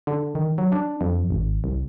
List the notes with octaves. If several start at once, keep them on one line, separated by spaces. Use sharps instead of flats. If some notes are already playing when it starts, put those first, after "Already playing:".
D3
D#3
F#3
D4
F2
G#1
C2